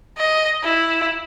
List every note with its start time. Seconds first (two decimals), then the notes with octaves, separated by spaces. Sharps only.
0.18 D#5
0.63 E4